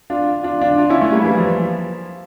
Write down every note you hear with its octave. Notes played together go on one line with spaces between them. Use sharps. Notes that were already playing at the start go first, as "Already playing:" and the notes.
D4 F4
D4 F4
D4 F4
D4 F4
C#4 E4
A3 C#4
G3 A#3
E3 G3
F3